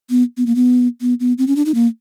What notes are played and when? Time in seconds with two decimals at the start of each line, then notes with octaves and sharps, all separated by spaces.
0.10 B3
0.37 B3
0.46 A#3
0.55 B3
1.01 B3
1.20 B3
1.38 C4
1.47 C#4
1.56 D4
1.65 D#4
1.75 A#3